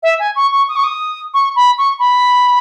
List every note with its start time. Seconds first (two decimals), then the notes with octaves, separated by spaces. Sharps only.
0.03 E5
0.19 G#5
0.36 C#6
0.52 C#6
0.69 D#6
0.76 C#6
0.84 D#6
1.34 C#6
1.56 B5
1.78 C#6
1.99 B5